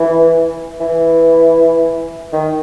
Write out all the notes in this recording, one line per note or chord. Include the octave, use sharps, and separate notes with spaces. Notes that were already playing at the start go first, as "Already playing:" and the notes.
Already playing: E3
E3
D#3